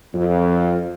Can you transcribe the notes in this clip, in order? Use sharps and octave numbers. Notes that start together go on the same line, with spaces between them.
F2